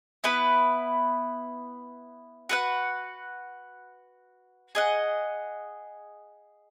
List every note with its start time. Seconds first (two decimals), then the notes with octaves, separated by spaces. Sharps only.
0.24 B3 E4 B4
2.49 F#4 B4 F#5
4.75 G#4 D#5 F#5